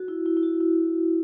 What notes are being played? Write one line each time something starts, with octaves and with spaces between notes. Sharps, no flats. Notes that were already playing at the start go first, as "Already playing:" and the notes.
Already playing: F#4
E4
E4
E4
F#4
E4